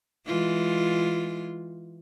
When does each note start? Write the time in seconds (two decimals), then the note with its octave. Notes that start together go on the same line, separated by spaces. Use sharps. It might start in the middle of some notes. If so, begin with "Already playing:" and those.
0.27 E3 G#3 F4